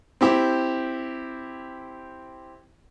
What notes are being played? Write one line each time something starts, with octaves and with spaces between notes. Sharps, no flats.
C4 E4 G4